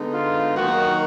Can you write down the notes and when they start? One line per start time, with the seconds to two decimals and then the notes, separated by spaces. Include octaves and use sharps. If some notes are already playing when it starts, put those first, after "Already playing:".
Already playing: D3 G#3 B3 D#4
0.13 F4
0.55 D#3 F#3 A#3 D#4 F#4